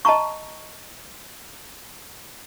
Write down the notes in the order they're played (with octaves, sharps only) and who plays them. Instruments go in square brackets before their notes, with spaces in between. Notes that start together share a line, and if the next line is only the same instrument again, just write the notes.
[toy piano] D#5 A5 A#5 C#6